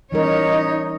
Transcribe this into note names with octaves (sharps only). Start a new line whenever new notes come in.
E3 G3 C#4 D#4 A#4 C#5 D#5